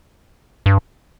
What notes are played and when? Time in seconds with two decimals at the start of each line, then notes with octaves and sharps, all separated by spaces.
0.66 G2